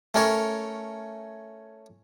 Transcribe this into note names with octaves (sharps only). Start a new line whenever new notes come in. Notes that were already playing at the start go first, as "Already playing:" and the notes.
A3 C#4 A#4 C#5